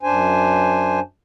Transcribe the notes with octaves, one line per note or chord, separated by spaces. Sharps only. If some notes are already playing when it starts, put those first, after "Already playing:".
F#2 D4 C5 G#5